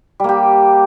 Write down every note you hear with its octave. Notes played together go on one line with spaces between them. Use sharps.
G3 A#3 G4